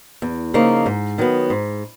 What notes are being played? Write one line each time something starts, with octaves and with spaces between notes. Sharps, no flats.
E2
C#3 F3 A#3 D#4
G#2
D#3 F#3 B3
G#2